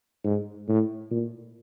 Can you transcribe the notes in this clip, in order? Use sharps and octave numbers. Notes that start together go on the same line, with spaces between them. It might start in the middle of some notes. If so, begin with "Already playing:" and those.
G#2
A2
A#2